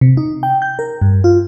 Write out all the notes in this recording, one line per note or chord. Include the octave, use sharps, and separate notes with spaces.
C3
D#4
G5
G6
A#4
G2
F4